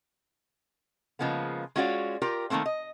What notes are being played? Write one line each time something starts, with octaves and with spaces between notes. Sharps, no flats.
C#3 F3 G#3 A#3 B3
G#3 C#4 F4 F#4 C#5 D5
F4 G4 A#4 G5
D#3 F#3 A3 A#3 C4
D#5